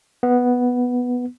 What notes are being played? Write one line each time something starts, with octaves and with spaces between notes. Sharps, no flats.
B3